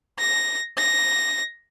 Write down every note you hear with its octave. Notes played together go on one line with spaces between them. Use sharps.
A#6
A#6